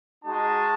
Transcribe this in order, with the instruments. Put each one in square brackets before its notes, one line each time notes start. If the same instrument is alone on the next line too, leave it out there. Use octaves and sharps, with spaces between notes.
[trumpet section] G#3 D#4 F#4 A5